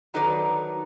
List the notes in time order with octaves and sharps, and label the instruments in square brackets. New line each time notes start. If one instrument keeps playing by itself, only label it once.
[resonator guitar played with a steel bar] D#3 F#3 D#4 A4 B4 D5